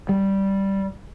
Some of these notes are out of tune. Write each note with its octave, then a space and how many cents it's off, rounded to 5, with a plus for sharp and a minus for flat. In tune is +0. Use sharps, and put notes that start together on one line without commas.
G3 -5